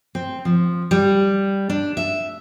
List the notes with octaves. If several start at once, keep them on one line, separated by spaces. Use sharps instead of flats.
C4
F3
G3
D4
E5